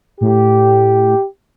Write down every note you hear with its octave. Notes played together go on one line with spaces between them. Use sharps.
A2 G4